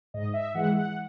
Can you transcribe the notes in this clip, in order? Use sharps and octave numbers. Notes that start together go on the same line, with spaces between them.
G#2 D#5
E5
E3 G#3 F#5
F#5